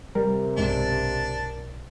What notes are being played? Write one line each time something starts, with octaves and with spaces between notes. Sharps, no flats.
C3 G3 A#4
B1 G2 G#3 D4